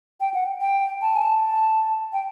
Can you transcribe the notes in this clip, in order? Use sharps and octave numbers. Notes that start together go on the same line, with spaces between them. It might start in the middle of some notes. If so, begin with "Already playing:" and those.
G5
F#5
G5
A5
G#5
A5
G5